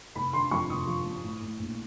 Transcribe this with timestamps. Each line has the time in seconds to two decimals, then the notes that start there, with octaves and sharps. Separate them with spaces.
0.15 F1 B5
0.33 D3 C6
0.51 F2 C#6
0.69 F1 D#6
0.87 F3
1.05 F1
1.23 A2
1.41 A2
1.59 A#1